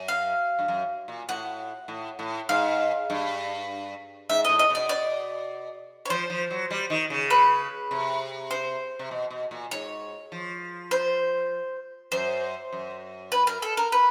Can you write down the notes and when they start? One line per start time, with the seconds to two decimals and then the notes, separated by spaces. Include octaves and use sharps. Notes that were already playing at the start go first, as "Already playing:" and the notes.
Already playing: F#2
0.08 F5
0.59 G2
0.68 F#2
1.08 A#2
1.29 A2 F#5
1.88 A2
2.19 A2
2.49 G#2 F5
3.10 G2
4.29 G#2 E5
4.45 A2 D#5
4.59 D#5
4.70 B2 D5
4.89 D5
6.05 C#5
6.10 F3 C5
6.30 F3
6.51 F#3
6.70 G3
6.90 D#3
7.10 C#3
7.30 B4
7.91 C3
8.51 C5
8.99 C3
9.11 B2
9.31 B2
9.51 A#2
9.71 G#2 C#5
10.32 F3
10.91 C5
12.12 F#2 C5
12.73 F#2
13.32 B4
13.47 A#4
13.62 A4
13.77 A#4
13.92 B4